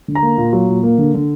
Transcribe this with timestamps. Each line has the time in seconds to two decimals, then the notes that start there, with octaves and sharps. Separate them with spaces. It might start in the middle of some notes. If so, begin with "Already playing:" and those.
0.08 D3
0.15 A#5
0.23 A#3
0.38 A#2
0.53 F#3
0.68 A#2
0.83 A#3
0.98 D3
1.14 D3